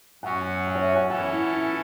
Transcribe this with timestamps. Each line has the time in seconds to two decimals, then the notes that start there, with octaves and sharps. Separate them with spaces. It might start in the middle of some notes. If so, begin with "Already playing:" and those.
0.23 F#2 F#3 C#4 F#4 F#5
0.67 F#5
0.75 C#5
0.82 E5
0.96 F#5
1.10 E3 C#4 A4 F#5
1.32 E4
1.55 E4